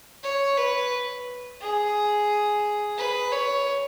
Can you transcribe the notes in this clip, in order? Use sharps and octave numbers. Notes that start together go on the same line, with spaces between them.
C#5
B4
G#4
B4
C#5